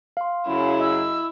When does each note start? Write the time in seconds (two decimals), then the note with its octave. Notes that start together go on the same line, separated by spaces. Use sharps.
0.17 F5 C6
0.46 F#2 C#3 F#3 E4
0.80 D#5 E6